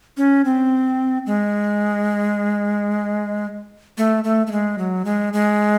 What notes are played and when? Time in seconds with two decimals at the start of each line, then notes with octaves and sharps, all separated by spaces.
0.17 C#4
0.45 C4
1.26 G#3
3.98 A3
4.24 A3
4.47 A3
4.52 G#3
4.78 F#3
5.05 G#3
5.33 G#3